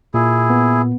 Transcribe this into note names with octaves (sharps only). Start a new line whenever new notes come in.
A#2 E4 G#4
B3